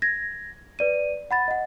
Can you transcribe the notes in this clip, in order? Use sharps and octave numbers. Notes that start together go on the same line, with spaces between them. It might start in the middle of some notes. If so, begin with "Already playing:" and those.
G#6 A#6
B4 D5 D#7
F#5 B5 A6
D#5 F#5